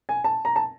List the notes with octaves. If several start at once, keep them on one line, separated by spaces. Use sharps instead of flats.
G#5
A5
A#5
A5